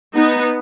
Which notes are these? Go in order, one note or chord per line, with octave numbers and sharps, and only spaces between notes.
B3 D#4